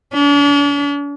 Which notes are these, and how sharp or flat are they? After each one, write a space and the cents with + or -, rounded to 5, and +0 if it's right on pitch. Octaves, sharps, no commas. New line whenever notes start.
D4 -45